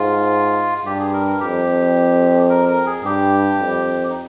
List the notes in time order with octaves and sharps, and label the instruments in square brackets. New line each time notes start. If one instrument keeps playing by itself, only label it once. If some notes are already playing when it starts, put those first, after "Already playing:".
Already playing: [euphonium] G#2 [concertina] F4
[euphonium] G2 [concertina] G4
[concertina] G#4
A#4
A#4
[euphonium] F2 [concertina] G4
[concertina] A#4
A#4
G#4
[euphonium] G2 [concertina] G4
[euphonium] F2
[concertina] D#4